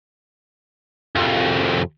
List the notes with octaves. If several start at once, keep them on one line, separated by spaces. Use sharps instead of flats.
C2 F2